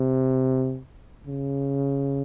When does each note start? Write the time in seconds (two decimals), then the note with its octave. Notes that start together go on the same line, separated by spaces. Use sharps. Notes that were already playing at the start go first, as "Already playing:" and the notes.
Already playing: C3
1.27 C#3